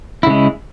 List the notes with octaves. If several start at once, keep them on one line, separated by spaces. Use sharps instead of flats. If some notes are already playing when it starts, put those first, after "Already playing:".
C#3 G#3 E4